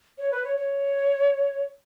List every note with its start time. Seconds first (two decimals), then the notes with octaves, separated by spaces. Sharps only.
0.18 C#5
0.32 B4
0.44 C#5
0.57 C#5